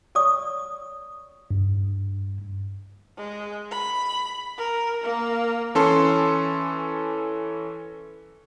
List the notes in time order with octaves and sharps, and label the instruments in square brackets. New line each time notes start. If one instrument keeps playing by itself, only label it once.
[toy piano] C#5 D5 C#6 D#6
[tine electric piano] G2
[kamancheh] G#3
B5
A#4
A#3
[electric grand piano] E3 C#4 A4 A5 C6